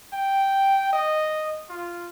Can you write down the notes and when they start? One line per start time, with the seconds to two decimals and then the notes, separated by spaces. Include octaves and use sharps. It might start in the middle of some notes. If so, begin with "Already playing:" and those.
0.13 G5
0.93 D#5
1.69 F4